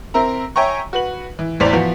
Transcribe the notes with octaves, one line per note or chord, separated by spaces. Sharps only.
C4 A#4 E5 A#5
C#5 E5 G5 G#5 A#5 C#6
F#4 B4 F#7
E3
A1 E2 C5 D5 B6 F7
E3 F3 B3 F#4